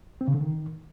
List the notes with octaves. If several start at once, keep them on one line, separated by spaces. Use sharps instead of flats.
C4
C#3
D3
D#3